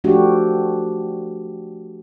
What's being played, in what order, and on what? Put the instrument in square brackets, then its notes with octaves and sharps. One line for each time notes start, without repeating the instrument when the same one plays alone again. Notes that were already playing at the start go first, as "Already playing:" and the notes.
[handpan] F3 A3 D4 F#4 G4